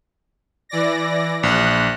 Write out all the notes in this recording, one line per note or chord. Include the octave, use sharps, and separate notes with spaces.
E3 D5 A#6
A#1 F#6